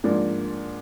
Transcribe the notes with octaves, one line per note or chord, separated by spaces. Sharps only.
G#2 F3 A#3 D4